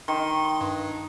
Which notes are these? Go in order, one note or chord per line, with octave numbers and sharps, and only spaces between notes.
D#3 C6
G2